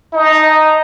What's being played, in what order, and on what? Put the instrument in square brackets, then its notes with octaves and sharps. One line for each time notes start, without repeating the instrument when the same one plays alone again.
[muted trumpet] D#4 [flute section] D#5 A5 A#5